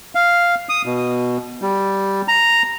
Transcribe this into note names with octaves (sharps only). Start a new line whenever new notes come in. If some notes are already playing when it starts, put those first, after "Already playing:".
F5
D#6
B2
G3
A#5